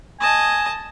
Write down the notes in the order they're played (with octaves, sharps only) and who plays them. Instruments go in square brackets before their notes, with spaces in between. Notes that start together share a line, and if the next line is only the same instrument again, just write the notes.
[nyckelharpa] D#5 A5 [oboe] G#5